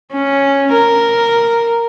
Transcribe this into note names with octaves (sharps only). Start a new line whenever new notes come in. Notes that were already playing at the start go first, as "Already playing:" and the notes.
C#4
A#4